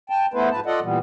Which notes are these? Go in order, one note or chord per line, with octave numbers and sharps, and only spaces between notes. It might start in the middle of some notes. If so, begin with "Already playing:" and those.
G5 A5
A3 B3 E4 A4 B4 C5
G#2 F3 B4 A5
F4 A4 D5 D#5 F#5
A#2 E3 G3 B3